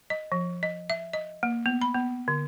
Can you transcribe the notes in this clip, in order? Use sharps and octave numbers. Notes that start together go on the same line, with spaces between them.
D#5
F3
D#5
E5
D#5
A#3
B3
B5
B3
D3